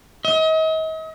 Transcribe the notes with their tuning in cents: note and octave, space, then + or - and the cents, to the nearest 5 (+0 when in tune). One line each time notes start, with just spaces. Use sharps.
D#5 +40